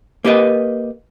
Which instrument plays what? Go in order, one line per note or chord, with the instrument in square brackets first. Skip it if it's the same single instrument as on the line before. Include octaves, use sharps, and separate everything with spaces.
[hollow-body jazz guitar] A#3 G4 B4 D#5